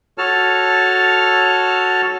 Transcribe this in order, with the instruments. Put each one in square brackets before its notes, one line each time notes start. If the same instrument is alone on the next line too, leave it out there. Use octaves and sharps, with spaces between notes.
[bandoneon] F#4 A4 C#5 A5 F6